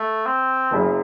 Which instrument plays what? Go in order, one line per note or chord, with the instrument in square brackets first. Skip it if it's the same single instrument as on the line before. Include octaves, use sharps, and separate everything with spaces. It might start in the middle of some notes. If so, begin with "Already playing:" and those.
Already playing: [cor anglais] A3
C4
[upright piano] F#1 F#2 C#3